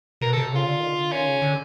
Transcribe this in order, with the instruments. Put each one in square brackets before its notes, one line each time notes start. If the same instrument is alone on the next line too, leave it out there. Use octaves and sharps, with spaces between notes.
[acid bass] B2 [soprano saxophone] A#4
[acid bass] C3 [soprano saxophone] A4
[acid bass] C#3 [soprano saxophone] F4
[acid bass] D3
D#3
D3
[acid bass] D#3 [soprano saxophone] C#4
[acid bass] C#3
D3